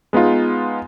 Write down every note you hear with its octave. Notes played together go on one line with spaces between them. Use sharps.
G#3 B3 D#4 F4